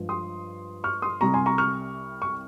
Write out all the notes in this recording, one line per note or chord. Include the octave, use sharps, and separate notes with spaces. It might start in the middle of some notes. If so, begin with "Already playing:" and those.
Already playing: G2 F3 G#3
C6 D#6
C#6 F6
C6 D#6
C2 C3 G3 A#5 C#6
G#5 C6
A#5 C#6
C#6 F6
C#6